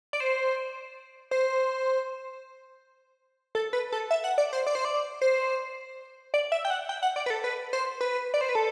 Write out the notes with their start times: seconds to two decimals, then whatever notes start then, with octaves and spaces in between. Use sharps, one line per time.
0.13 D5
0.20 C5
1.31 C5
3.55 A4
3.73 B4
3.92 A4
4.11 E5
4.24 F#5
4.38 D5
4.53 C5
4.67 D5
4.75 C5
4.85 D5
5.21 C5
6.34 D5
6.52 E5
6.65 G5
6.70 F#5
6.89 G5
7.03 F#5
7.16 D5
7.26 B4
7.30 A4
7.44 B4
7.73 C5
8.01 B4
8.34 D5
8.41 C5
8.49 B4
8.55 A4